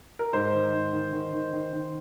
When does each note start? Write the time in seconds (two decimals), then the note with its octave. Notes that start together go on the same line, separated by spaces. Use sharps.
0.19 A#4
0.33 G#2 C5
0.53 D#3
0.73 G#2
0.93 D#3
1.13 D#3
1.33 D#3
1.53 D#3
1.73 D#3